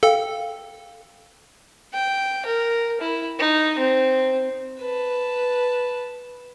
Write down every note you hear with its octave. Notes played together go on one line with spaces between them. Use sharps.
A4 F5 G5
G5
A#4
E4
D#4
C4
B4 A5